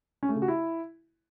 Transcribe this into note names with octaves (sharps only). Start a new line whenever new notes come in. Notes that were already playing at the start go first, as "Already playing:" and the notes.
C#4
A3
C#3
F#4
E4